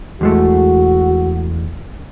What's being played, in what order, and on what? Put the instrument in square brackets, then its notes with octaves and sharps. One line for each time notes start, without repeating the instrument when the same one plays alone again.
[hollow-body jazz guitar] E2 G#3 A3 [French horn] F#4